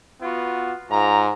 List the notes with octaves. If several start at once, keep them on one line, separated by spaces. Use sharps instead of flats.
B3 F4 F#4
G#2 F4 A#5